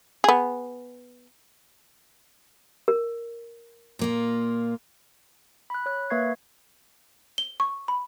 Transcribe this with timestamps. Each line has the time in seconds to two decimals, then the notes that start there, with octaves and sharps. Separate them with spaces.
0.24 B3 G#4
2.88 A#4
3.99 A#2 A#3 F4
5.70 B5 F#6
5.86 C#5 F#6
6.10 A#3 B4 E5 C#6 G#6 C7
7.38 G7
7.60 C#6
7.88 B5